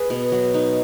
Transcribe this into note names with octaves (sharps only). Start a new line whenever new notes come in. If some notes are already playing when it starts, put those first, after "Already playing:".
Already playing: G#4 B4
B2
F#3
D#4